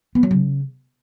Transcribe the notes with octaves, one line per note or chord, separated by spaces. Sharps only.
B3
F#3
C#3